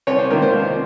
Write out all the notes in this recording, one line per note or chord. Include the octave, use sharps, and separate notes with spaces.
C2 C#5
C5
C3 D#3 A#3 F4 A#4
C5
C2